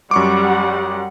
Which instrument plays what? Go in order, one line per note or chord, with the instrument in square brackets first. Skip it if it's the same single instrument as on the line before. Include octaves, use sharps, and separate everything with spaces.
[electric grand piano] F#2 C#6 D6 [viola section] G3 G4 F#5